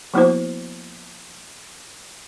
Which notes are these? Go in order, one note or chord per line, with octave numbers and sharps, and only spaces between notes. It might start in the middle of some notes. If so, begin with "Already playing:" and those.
F3 A#3 B3 E4 F#4 C5